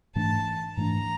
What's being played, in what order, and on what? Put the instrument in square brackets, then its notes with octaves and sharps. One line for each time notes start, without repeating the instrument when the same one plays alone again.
[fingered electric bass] G#2 E3 A3 D4 [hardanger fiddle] A5
[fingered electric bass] G#2 E3 A3 D4 [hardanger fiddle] A#5